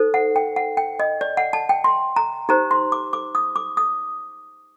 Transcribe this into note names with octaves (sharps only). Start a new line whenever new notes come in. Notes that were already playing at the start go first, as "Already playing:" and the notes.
Already playing: D#4 A4 C5
F#5
G5
F#5
G5
D#5
D5
F#5
A5
G5
C6
A#5
D#4 G4 C5 A#5
C6
D6
D6
D#6
D6
D#6